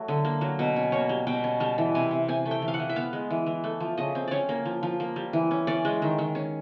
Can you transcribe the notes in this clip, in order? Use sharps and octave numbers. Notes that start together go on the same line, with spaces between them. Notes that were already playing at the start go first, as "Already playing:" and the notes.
Already playing: F#3 A3
D3
A#3
F#3
B2
C#4
A#3 C#5
G3
B2 G5
C#4
G3 A5
E3
C3 G#5
C3
C4 G#5
A3
G5
E3
F5
F#5
E3
E5
B3 F5
G#3
E3
E3
A3
F3
C#3 D#5
C4
C#4 C#5 D5
A#3
F3
F3
A#3
G3
E3
C#4
C#4 D5
G#3
D#3
D#3
C#4